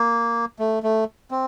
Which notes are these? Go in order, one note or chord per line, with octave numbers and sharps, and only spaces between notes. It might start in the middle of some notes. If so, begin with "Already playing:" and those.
Already playing: A#3
A3
A3
C4